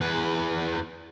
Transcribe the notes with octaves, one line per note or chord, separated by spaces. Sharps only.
E2 B4